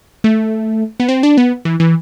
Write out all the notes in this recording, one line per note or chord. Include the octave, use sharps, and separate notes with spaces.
A3
B3
C4
D4
B3
E3
E3